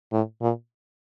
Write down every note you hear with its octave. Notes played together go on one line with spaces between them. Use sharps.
A2
A#2